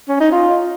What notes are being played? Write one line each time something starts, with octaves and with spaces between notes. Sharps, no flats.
C#4
D#4
F4